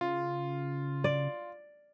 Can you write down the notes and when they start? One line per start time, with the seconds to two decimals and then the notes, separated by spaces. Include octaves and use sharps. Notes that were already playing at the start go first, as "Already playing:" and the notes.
0.01 C#3 F4
1.04 D5